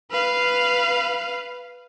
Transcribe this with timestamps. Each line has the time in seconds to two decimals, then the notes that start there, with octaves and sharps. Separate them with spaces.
0.11 B4 F5